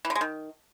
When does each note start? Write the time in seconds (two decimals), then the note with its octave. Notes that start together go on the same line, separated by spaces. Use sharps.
0.05 E3
0.10 D3
0.15 G#3
0.21 D#3